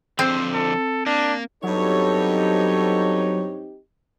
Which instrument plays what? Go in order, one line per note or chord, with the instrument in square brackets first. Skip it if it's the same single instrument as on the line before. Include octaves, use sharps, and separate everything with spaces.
[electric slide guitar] F2 D3 C5 [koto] C4
[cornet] A4
[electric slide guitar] A#3 [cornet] D4
[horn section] G2 B3 C#5 [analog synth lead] F#3 [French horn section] C4 D#4 G4 [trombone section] A4